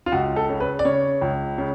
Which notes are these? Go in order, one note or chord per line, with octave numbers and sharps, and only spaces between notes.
F4
C#2 F#4
A4
C#3
B4
D5
C#3 C#5
C#2
C#3